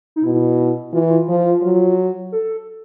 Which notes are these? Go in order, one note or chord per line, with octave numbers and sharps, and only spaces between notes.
D#4
B2 E4
E3 F4
E4
F4
F3
F#3
A4